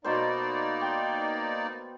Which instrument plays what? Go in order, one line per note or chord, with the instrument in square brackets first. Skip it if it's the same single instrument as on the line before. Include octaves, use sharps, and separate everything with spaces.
[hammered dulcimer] B2 C5 [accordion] A#3 D#4 D5
[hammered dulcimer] G5